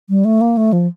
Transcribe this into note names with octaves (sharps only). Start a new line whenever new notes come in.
G3
A3
A#3
A3
F3